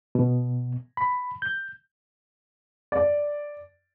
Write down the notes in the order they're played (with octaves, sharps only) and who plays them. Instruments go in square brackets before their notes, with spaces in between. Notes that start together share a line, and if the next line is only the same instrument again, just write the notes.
[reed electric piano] B2
B5
G6
[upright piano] D5